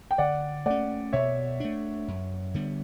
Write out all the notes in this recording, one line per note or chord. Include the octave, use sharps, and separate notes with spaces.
G5
D3 D5 F#5
A3 C#4 D5 F#5
B2 C#5 E5
A3 D4
F#2
D3 G3 B3